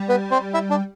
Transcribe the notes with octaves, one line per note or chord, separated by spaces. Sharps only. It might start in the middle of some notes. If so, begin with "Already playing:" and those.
Already playing: G3
B3 B4
C4 C5
E4 E5
D4 D5